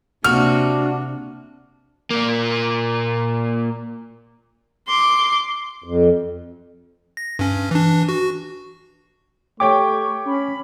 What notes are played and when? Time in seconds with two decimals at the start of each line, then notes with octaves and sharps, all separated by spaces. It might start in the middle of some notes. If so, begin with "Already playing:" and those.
0.24 C3 A#3 D4 F#4 F6
2.11 A#2 A#3
4.88 C6 D6
5.84 F2
7.17 A#6
7.39 G2 C#4
7.71 E3 D4
8.09 F#4
9.60 A3 G4 C#5 G5 C#6 D6
10.26 C#4 B5